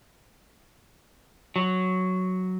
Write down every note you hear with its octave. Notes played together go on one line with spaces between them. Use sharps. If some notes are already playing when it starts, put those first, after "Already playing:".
F#3